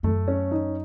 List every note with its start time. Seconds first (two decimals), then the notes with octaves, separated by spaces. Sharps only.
0.03 F#2 A3
0.28 C#4
0.51 D#4